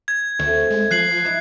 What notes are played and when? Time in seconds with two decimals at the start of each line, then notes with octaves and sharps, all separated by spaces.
0.08 G#6
0.39 D2 A3 C4 A4
0.70 G#3
0.91 F3 F#6 C7 F#7
1.24 G2 D#4 E4